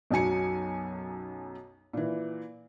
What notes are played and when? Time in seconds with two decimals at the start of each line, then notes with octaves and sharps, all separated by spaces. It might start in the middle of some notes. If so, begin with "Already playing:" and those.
0.11 B1 F#2 F#3 G#5 C#7
1.93 A#2 E3